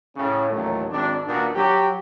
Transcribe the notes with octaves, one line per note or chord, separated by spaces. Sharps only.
A2 C#3 C#4
A1 D#2 A#2 F#3 A3
G#1 D4
D#2 A#2 A#3 B3 D4 F#4
F#3 G4